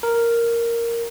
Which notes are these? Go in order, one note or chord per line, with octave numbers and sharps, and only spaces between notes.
A#4